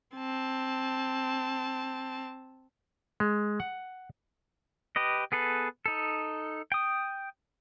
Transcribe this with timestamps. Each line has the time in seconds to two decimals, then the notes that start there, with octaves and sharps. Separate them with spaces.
0.16 C4 A5
3.20 G#3
3.60 F#5
4.96 G4 B4 D#5
5.32 B3 G#4 A4 B4
5.86 D#4 A4
6.72 G5 D#6